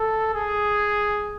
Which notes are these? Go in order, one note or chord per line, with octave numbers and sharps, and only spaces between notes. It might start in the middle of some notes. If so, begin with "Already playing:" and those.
Already playing: A4
G#4